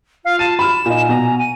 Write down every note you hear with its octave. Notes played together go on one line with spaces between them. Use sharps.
F4 F5
A5 D#7
B5 F6 E7
A#2 D#4 G#5
B2 A#5
D#7